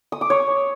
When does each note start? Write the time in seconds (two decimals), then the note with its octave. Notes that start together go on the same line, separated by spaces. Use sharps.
0.12 D#6
0.21 D6
0.30 C#5